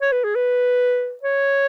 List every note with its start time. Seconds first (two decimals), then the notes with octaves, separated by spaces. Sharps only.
0.02 C#5
0.12 B4
0.24 G#4
0.35 B4
1.23 C#5